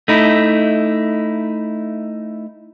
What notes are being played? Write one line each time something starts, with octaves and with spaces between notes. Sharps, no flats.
A3 D#4 E4